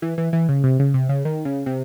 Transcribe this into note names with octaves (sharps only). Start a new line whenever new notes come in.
E3
E3
E3
C#3
C3
C#3
C3
C#3
D#3
C#3
C3